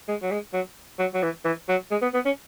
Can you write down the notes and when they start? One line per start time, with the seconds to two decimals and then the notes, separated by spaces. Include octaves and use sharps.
0.08 G#3
0.22 F#3
0.31 G#3
0.53 F#3
0.99 F#3
1.14 F#3
1.23 E3
1.45 E3
1.69 F#3
1.91 G#3
2.02 B3
2.14 B3
2.25 C#4